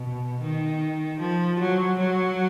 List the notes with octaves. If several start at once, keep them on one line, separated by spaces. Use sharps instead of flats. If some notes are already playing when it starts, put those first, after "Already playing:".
Already playing: B2
D#3
F3
F#3
F#3